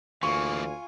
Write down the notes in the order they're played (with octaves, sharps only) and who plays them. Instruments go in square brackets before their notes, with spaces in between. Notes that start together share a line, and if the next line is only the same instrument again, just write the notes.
[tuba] D2 [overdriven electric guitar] E3 A#3 [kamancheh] F4 G#5 [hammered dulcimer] C#6